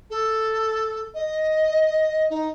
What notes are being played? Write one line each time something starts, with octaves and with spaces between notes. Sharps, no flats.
A4
D#5
D#4